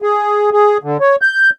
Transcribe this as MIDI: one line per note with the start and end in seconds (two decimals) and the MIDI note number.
0.02 0.50 68
0.53 0.78 68
0.83 0.97 50
1.00 1.16 73
1.22 1.50 91